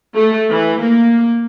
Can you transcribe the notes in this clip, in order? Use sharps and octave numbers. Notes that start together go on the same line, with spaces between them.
A3
E3
A#3